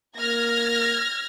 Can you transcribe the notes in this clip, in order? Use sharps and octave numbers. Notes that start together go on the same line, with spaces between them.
A#3 F6 G#6 A#6